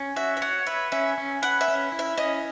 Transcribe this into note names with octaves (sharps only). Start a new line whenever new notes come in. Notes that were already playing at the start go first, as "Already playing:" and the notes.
Already playing: C#4
F#4 E5
E5
C#5 F#5
B4 E5
C#4 E5
C#4
B4 F#5
E5
C#4
E4
E5
C#4 D#5